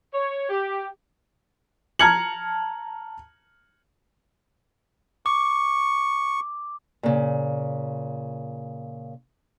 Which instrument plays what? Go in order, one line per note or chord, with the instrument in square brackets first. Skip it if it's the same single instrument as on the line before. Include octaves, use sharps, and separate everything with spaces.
[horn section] C#5
G4
[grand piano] A5 A#5 F6 G#6 C#7 F#7
[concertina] C#6 [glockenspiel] D6
[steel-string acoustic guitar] A#2 C#3